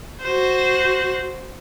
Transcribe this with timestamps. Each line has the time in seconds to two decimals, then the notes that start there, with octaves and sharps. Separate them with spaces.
0.22 F#4 C5